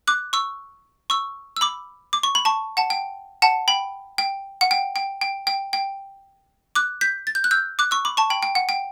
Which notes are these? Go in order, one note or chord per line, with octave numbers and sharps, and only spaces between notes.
D6 F#6
C#6 E6
C#6 E6
E6
B5 D6
D6
C#6
B5
A5 C#6
F#5 A5
G5
F#5 A5
G5 B5
G5
F#5
G5
G5
G5
G5
G5
D6 F#6
G6 B6
A6
G6
F#6
E6 G6
D6 F#6
C#6 E6
B5 D6
A5 C#6
G5 B5
G5
F#5
G5